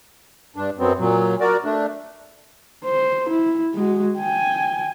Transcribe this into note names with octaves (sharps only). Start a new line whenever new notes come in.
G2 D4
F#2 F#3 B3 C4
A#2 F#3
F#4 A#4 D5
A3 D4
C5
E4
G#3 F#4
G5 G#5